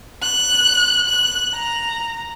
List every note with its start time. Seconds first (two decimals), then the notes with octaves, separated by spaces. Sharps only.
0.22 F#6
1.07 F#6
1.54 A#5